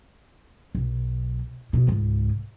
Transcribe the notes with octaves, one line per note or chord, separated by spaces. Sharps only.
B1
B2
C#2 G#2